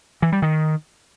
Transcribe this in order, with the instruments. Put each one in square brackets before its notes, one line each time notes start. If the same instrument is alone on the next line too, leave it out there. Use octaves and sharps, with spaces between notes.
[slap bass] E3
G3
D#3